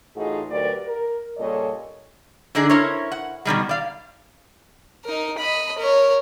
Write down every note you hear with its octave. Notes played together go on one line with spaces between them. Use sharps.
A2 E3 D#4 F4 F#4 G#4
D2 F#3 G4 A#4 B4 D5
A#4
A#2 C#3 G3 A4 C#5 D#5
D3 D4 D#4 G#4
C#4 E4 A#4 C5 C#5
F#5
B2 D#3 G3 G#3
D5 F5
D#4 A#4
D#5 B5
A#4 C#5